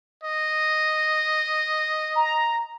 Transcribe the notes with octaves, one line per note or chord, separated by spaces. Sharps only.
D#5
A#5